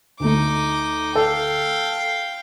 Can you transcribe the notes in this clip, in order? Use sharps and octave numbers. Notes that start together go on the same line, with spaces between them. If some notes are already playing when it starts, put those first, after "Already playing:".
D2 A3 D#4 D6
A4 F5 G5